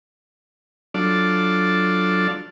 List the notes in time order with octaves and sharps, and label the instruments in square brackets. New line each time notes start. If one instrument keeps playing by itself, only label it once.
[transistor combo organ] F#3 D4 F4 A4 D5